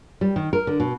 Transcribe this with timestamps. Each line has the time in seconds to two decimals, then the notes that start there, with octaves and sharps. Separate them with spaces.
0.21 G3
0.36 D#3
0.53 A#4
0.67 D3
0.80 B2